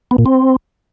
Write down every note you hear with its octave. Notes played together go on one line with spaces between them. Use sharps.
B3
A#2
C4